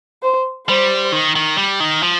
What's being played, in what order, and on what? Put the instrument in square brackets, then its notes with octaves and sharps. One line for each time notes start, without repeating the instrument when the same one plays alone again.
[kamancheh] C5
[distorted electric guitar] G3 [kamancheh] C5
[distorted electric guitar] D#3
D#3
G3
D#3
F3